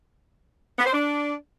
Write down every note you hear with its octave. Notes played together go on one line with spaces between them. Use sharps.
B3
C5
D4